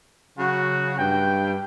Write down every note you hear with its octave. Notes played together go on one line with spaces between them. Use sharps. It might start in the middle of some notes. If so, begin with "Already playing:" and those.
C#3 F#3 F#4
G2 G5